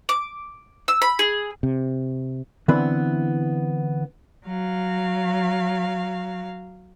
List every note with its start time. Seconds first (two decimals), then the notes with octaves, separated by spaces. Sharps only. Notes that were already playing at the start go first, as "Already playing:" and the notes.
0.09 D6
0.88 E6
1.02 B5
1.19 G#4
1.63 C3
2.68 D3 E3 B3 C4 E4 B4
4.46 F#3 F5